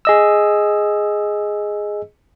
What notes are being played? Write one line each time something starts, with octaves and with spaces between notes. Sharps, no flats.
G#4 D#5 E6